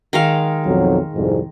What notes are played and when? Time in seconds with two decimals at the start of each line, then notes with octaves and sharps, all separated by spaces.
0.13 D#3 G#3 F5
0.65 B1 F2 F#3
1.14 C2 F2 G#2